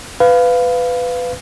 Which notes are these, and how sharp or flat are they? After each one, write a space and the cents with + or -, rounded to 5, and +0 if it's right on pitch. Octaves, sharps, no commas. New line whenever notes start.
B4 +15 F5 +0